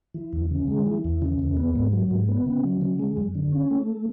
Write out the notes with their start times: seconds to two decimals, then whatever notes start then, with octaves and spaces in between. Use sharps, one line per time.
0.14 E3
0.33 E2
0.51 C#3
0.68 G#3
0.86 E3
1.04 E2
1.22 C#3
1.39 E2
1.57 B3
1.76 G#2
1.93 F#3
2.11 G#2
2.29 B3
2.46 C#3
2.63 F#3
2.81 C#3
2.99 G#3
3.17 F#2
3.35 D3
3.52 C#4
3.70 A3